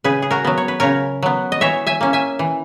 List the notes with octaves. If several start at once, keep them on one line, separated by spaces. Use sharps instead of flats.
C#3 G#4 B4
G#4
F#4 A#4
F#3 B3
C#5
B4
C#3 A#4 C#5
F#3 B3
D#5
E3 C#5 E5
E5 G#5
A#3 C#4
E5 G#5
E3